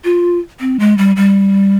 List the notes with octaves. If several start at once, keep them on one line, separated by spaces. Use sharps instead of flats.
F4
C4
G#3
G3
G3